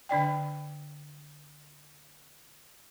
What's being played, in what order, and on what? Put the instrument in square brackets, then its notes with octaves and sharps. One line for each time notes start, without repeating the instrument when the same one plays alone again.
[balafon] D3 D4 D5 G5